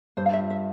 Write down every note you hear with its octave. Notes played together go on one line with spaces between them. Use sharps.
G2 C5
F5
E5
F4
E5